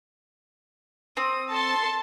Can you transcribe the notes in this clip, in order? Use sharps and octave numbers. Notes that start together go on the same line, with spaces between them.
C4 D#6
A4 A5 C6